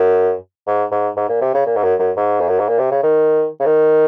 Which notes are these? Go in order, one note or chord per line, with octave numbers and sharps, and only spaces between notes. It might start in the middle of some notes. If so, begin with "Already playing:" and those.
Already playing: F#2
G#2
G#2
G#2
A#2
C3
C#3
A#2
G#2
F#2
F#2
G#2
F2
F#2
G#2
A#2
C3
C#3
D#3
C#3
D#3